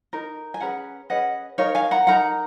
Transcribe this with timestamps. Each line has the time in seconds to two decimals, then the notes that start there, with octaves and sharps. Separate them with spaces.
0.13 D#4 A#4
0.54 G#5
0.60 C#4 G#4 B4 F#5 A#5
1.10 C#4 G#4 B4 D#5 F#5
1.58 D#4 A#4 C#5 F5
1.75 F5 G#5
1.91 F#5 A#5
2.07 D#4 A#4 F#5 A#5